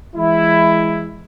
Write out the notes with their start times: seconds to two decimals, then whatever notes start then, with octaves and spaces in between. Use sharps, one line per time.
0.15 E3 G#3 E4